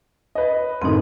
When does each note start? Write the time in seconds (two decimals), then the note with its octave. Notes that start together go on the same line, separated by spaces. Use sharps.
0.35 B4 D#5
0.82 F#2 A2 D#3 C4 D#4